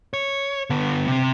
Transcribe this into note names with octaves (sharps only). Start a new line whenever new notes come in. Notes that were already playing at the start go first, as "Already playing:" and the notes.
C#5
D3 B3
C3 C4